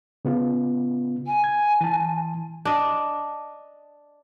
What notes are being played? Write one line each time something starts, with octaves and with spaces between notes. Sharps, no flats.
C#3 B3 F4
G#5
G#6
E3 A5
D4 D#5